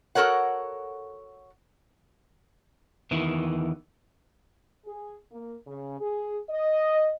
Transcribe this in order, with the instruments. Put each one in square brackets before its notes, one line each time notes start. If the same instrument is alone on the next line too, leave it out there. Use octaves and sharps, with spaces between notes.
[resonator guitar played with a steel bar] F#4 A4 A#4 C#5 F#5
[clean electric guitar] E2 D#3 E3
[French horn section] G#4
A#3
C#3
G#4
D#5